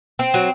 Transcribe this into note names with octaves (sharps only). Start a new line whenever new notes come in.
C4
F#3